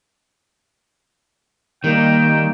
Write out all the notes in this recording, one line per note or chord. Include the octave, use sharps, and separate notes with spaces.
D#3 G3 A#3 D#4 G5